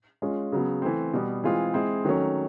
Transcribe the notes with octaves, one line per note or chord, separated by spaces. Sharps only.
G#3 C#4 F4
C#3 F#3 B3
E3 A3 C4
B2 G3 B3
E3 G#3 C4 F4 G#4
G#3 C4 E4 G#4
D#3 F#3 A3 C#4